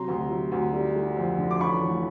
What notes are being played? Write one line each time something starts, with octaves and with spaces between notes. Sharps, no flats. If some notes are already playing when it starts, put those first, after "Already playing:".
Already playing: C3 F#3 A#5 C6
D2
F#3
D2
G3
G3
F2
D3
D6
A1 B5 C#6
A1